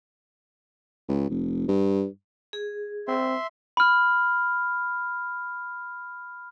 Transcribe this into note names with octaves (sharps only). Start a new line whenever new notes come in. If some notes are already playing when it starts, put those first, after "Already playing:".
C#2
F1
G2
G#4
C4 E5 C6
B5 F6